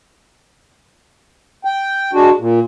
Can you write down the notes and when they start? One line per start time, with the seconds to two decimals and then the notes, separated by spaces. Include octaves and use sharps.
1.65 G5
2.13 G#3 D4 F#4
2.39 A#2